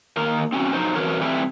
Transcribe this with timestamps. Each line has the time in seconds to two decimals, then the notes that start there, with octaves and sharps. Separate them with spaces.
0.17 D#3 A#3 A#4
0.53 C4 C#4 F#4
0.73 F3 F#3 D#4 C5
0.95 F2 E3 F#4 A#4 C#5
1.21 E3 G3 A3 C4 E4